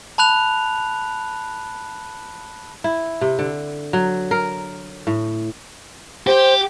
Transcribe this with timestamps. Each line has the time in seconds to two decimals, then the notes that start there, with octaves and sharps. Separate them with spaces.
0.18 A5 B5 F#6 F7
2.84 E4
3.21 C3
3.39 D3
3.93 F#3
4.31 A#4
5.07 A2
6.27 G4 C5